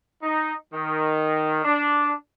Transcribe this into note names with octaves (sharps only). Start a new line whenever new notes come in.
D#4
D#3
D4